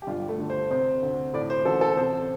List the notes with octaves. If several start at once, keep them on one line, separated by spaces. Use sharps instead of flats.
G4
G1 F4
A3
D3
C5
C3 C5
D2
A2 D5
C5
A1 A4
A4
C3 C5